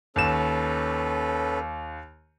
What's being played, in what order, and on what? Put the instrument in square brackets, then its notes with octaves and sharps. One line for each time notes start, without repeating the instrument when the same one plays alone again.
[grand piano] D#2 E7 [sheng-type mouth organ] C#4 A4 B4